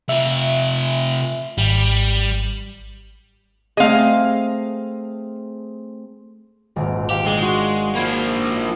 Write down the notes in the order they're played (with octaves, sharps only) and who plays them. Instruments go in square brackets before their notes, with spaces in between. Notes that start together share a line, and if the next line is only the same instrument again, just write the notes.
[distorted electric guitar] C3 F4 [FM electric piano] E5
[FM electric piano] G#1 [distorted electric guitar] G3
[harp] A3 C4 G#4 [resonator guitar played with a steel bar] D#5 F5
[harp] D#1 G#1
[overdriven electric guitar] G4 [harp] F5
[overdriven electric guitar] G#3 [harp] D4
[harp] F#4 C6
[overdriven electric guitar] F3 A#3 [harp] B5 G#6